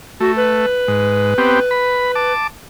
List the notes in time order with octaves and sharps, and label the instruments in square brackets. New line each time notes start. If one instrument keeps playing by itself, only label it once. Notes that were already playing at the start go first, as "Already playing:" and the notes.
[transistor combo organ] A3 [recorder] F#4
[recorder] B4
[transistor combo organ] G#2
B3 C4 G4
B5
A5 D6